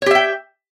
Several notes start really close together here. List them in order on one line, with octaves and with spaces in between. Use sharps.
C#5 G4 E5 G5